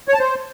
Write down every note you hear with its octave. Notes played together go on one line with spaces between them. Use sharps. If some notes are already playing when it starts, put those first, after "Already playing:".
C#5
A5
C5